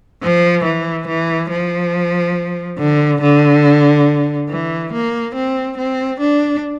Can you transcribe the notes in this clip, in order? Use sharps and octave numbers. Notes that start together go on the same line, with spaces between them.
F3
E3
E3
F3
D3
D3
E3
A#3
C4
C4
D4